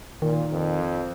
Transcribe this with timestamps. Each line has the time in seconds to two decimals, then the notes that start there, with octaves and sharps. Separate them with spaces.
0.22 A#2 D#3
0.52 F2